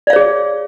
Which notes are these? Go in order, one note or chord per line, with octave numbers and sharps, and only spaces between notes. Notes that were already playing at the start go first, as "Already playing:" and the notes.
G#4 C#5 D5 F5